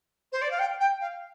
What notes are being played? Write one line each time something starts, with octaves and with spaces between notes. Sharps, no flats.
C5
D5
F5
G5
G5
F5